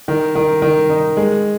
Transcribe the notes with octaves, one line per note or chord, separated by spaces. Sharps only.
D#3
D#3
D#3
D#4
G#3